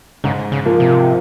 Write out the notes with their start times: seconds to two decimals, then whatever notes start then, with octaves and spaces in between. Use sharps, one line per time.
0.24 G#2 C#3
0.52 C#3
0.66 F3 A#3
0.80 C3